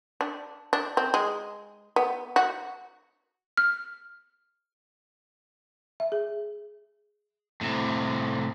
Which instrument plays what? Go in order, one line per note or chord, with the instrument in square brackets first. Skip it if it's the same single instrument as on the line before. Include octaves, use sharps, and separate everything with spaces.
[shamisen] D4
D4
C4
G#3
B3
F#4
[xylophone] F6
[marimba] E5
G#4
[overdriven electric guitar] A2 C3